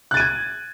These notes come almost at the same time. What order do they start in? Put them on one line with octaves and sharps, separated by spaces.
F#6 A6 D#7 G#6